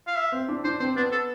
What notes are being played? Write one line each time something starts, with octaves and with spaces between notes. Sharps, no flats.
F5
E5
C4
D4
D4 C5
C4 C5
B3 D4
A4